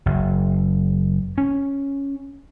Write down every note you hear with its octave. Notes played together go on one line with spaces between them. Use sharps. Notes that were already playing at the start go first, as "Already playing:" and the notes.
F#1
C#4